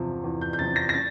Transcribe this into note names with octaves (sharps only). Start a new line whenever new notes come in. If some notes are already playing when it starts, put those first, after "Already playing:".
Already playing: E2 C3 F3
E2
G6
G6
C3 F3 A6
A#6
A#6
A6